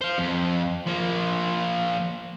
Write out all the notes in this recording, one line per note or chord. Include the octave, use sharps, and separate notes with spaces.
C5 F5
F2
F3 A#3